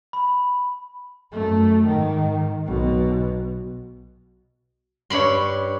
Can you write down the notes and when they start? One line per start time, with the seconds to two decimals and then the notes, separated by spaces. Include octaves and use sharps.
0.13 B5
1.32 F#2 A3
1.86 G#2 D#3
2.67 B1 B2
5.10 G2 C#5 B5 C6 F#7